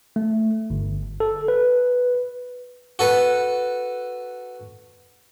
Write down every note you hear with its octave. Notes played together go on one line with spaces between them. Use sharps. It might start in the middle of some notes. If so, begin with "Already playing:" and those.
A3
G1
A4
B4
F#4 A4 B4